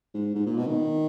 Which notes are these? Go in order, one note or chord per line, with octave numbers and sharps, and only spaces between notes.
G#2
G#2
A#2
B2
D#3